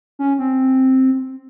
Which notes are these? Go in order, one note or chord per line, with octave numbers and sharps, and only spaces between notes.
C#4
C4